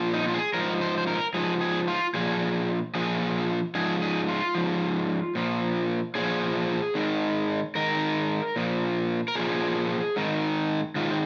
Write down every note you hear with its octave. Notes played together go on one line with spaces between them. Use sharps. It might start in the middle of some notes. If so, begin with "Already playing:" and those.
Already playing: A#2 F3
D#4
F4
G#4
G#2 F3 A#4
C5
C5
A#4
G#2 F3 G#4
G#4
F4
A#2 F3 G#4
A#2 F3 G#4
G#2 F3 G#4
G#4
F4
G#2 F3
A#2 F3
A#2 F3 G#4
G#2 D#3
G#2 D#3 A#4
A#2 F3
A#4
A#2 F3 G#4
G#2 D#3
G#2 D#3 F4
C4